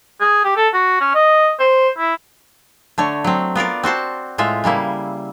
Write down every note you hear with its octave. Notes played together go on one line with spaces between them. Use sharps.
G#4
G4
A4
F#4
C#4
D#5
C5
E4
D3 A3 C#5
F#3 C4
B3 F4 A#4 D5
C4 F#4 C5 A5
A2 G#3 F4 E5
C#3 G3 A#3 E4